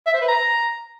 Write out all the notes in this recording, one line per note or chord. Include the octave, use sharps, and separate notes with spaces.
E5
C5
B4
A#5